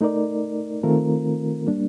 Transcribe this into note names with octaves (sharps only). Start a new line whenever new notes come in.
A3 D#4 A#4 D5
D#3 A3 C4 F4 A#4
G3 A#3 D4